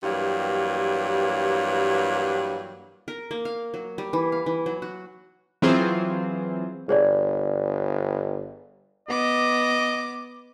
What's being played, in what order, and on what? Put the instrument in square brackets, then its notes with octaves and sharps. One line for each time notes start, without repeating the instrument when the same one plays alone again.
[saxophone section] G2 E3 F#3 A#3 G4
[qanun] A#4
A#3
F5
F#3
G3
E3
F5
E3
F#3
F#4
[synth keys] E3 F#3 C4 F4 G#4 C5
[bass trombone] G1 [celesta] G#4 C#5 D5
[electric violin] B3 D6 [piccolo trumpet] D#5